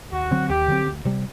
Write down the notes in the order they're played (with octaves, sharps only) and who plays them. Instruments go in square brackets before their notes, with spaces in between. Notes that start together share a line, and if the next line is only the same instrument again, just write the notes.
[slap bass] D#2 [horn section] F#4
[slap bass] D3 F#3 C4
[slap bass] D#2 [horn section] G4
[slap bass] D3 F#3 C4
D2
C3 G3